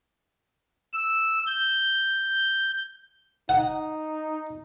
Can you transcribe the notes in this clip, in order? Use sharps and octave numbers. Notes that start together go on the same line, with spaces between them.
E6
G6
D#4 F#5